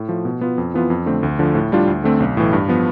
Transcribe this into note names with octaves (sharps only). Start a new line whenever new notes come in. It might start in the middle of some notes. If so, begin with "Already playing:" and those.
Already playing: A2
F3 A3
B2
B3 F4
F2
E3 B3 F4
F2
D3 A3 C4
D2
D3 F3
A2
G3 D4 F4
D2
D3 A3 C4
B1
A2 E3
G2
F3 B3